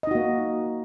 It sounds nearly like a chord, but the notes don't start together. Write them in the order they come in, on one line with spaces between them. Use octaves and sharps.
D#5 D#4 F#4 A#3